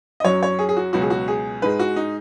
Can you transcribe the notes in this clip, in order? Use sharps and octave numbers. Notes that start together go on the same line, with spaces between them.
D#5
F#2 F#3 C#5
C#5
G#4
G#4
F#4
C#2 B2 F#3 F#4
G#4
F#4
G#4
G#2 G#3 B4
F#4
D#4